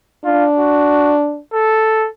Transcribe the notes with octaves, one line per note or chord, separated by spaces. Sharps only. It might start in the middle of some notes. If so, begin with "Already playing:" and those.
D4 F4
F#4
A4